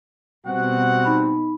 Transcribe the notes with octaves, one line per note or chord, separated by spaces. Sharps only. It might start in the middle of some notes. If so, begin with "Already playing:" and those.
B2 G3 C4 F#4 F#5
D#4 B5